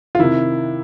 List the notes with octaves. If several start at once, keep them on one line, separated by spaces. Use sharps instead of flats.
F4
C3 D#3 E4